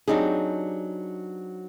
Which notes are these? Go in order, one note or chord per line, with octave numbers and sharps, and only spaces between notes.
F#3 C4 D4 D#4 G4 G#4